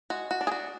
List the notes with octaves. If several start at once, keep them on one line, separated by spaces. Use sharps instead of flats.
G#3 F#4
F#4
D4
G#4
F#4